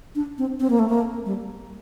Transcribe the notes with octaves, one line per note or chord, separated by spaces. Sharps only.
D4
C4
C4
A#3
A3
A#3
G3